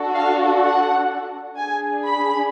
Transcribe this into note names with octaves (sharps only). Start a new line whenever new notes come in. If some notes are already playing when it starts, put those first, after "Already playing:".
Already playing: D4 F#4 A4
F5
F#5
D4 G#4 G#5
B5